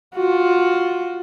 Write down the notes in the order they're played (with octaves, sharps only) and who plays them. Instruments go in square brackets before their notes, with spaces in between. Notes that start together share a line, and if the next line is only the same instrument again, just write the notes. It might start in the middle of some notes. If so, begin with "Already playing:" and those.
[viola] F4 F#4